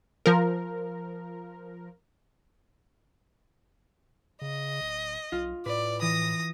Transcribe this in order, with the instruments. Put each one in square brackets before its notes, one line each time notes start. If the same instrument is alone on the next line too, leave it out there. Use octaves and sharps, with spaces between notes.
[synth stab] F3 A#4
[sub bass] C#3 [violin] D#5
[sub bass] D1
[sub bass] B1 [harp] F4
[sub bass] A2 [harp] B4 [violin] D5
[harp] E3 [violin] D#6 A#6